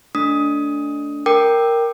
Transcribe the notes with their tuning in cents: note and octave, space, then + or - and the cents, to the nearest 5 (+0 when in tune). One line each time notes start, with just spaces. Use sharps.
A3 +0 D4 -20 D#6 +15
A#4 +0 G5 +0 D6 +25